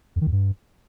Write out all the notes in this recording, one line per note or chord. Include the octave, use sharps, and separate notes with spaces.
F2
D#3
E2
G2